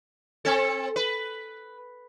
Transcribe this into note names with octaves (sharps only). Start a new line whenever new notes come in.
C4 A4
B4